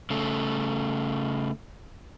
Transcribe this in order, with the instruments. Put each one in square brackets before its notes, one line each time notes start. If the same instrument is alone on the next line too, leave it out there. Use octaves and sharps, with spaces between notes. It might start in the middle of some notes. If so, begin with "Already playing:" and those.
[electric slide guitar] C#3 A3